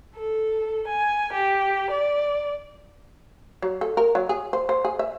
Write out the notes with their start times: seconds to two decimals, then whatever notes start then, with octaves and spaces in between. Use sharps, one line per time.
0.15 A4
0.88 G#5
1.32 G4
1.90 D5
3.62 F#3
3.81 A4
3.97 A#4
4.15 F#3
4.29 G#4
4.53 C5
4.69 C5
4.85 G#4
4.99 E5